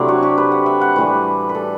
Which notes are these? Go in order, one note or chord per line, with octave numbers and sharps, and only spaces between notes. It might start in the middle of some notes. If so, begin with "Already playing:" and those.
Already playing: C3 F#3 A3 C4 D4 E4
F#4
G4
B4
F#5
E5
F#5
A2 E3 G3 B4
B4
A4